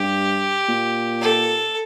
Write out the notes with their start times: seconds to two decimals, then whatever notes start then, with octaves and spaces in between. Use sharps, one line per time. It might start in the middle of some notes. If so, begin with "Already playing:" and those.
Already playing: G2 G4
0.68 A#2
1.21 A4